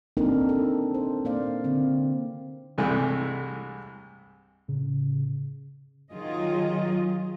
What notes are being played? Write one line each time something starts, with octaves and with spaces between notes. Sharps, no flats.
A#3 C4 D4 D#4 A4 A#4
A4
C5
A#3 C5 D5 F5
D3 C4
C2 G2 C3 E3 G#3 A3
A2 C#3
D#3 F#3 F4 G#4 D#5